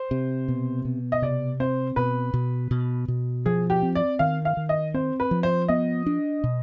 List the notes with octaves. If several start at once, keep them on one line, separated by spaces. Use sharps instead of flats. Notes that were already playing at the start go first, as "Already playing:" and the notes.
Already playing: C5
C3
B2
B2
D#5
C3 D5
C4 C5
B2 B4
B2
B2
B2
F3 G#4
G4
C4
D5
D#3 F5
F5
D#3
D#5
C4 C5
B4
F3
C5
B3 D#5
D4
B2